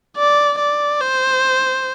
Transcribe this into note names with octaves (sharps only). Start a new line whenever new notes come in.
D5
D5
C5